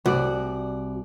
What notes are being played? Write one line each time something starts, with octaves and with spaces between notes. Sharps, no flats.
C2 F#4 D5